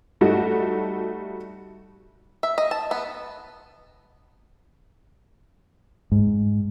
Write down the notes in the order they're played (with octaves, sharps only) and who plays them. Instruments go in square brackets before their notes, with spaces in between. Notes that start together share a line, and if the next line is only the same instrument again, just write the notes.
[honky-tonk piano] G3 A3 D#4 F#4
[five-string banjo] E5
D#5
A5
B3
[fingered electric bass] G#2